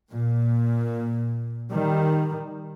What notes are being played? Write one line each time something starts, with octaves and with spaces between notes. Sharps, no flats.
A#2
D#3 G3